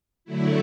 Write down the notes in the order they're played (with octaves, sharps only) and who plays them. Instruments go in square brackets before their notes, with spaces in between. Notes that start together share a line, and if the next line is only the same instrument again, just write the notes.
[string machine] D3 F#3 A3 E4